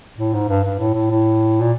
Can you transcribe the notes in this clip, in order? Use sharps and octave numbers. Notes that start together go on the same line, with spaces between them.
A2
G#2
G2
G2
A2
A2
A2
A#2